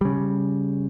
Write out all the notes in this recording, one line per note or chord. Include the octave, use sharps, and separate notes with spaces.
C#3 G3